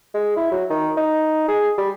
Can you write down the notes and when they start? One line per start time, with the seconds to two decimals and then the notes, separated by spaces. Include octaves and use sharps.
0.14 G#3
0.36 E4
0.51 F#3
0.70 D#3
0.97 D#4
1.48 G#4
1.78 G3